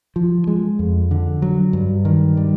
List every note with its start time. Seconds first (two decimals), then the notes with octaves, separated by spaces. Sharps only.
0.16 F3
0.47 G#3
0.79 F2
1.11 D3
1.42 F#3
1.73 G2
2.05 D#3
2.37 G3